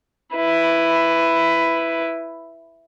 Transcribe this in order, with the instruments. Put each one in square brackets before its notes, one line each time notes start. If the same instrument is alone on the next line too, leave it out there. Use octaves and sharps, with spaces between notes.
[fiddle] E4 B4